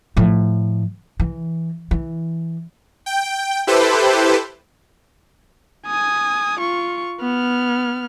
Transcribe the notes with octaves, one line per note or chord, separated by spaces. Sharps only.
A2 F3
E3
E3
G5
E4 G4 A4 B4 C5
G#5 D#6
F4 C#6
B3 F6